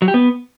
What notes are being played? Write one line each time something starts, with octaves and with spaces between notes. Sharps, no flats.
F#3
G4
B3